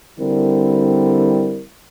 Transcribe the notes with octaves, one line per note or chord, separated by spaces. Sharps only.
D3 G3 C4 E4 A#4